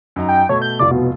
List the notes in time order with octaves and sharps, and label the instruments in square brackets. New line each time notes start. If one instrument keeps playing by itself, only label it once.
[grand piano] F#2 D#4 A#5
[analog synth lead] G5
[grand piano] B2 A3 A5 [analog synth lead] C#5
[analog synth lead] G6
[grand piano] F1 C2 F4 [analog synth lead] D5
[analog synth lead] B2